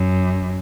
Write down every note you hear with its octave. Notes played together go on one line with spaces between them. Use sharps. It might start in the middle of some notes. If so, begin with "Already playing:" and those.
Already playing: F#2